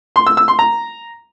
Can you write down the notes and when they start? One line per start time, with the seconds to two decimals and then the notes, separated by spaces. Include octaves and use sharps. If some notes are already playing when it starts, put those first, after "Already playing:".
0.16 C6
0.27 E6
0.37 E6
0.48 C6
0.59 A#5